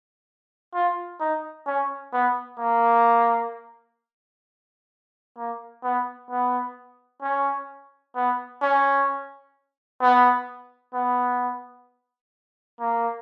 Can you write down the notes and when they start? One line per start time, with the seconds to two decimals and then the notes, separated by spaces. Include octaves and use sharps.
0.74 F4
1.20 D#4
1.67 C#4
2.13 B3
2.59 A#3
5.37 A#3
5.83 B3
6.31 B3
7.22 C#4
8.15 B3
8.62 C#4
10.01 B3
10.94 B3
12.80 A#3